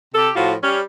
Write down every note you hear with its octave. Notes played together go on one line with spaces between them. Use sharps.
C3 G4 A4
A2 F3 F4 F#4
G3 C#4